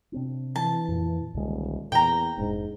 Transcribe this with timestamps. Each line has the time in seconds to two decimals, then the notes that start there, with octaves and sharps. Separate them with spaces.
0.12 C3 C4 D4
0.56 E3 A5
0.88 F2 A#2
1.34 D#1 C2 D3 G#3
1.92 E2 A#2 G5 A#5
2.38 F1 G#2 D4